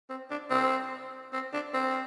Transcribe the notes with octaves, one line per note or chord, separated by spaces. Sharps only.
C4
D4
C4
C4
D4
C4